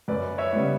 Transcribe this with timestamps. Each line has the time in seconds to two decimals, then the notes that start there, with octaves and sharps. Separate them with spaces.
0.08 F#2 B4 D5
0.38 C#5 E5
0.53 C#3 G3 B3